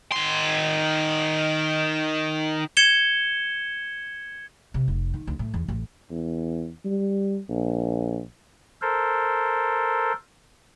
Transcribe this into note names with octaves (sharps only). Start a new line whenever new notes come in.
D#3 C6
G#6 C#7 E7 G7
C3
F1
D#3
D2
A2
E2
A1
E2
G3
A#1
A4 A#4 C5